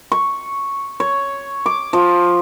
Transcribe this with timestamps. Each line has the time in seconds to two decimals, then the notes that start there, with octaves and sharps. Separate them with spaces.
0.12 C#6
1.00 C#5
1.66 D6
1.93 F3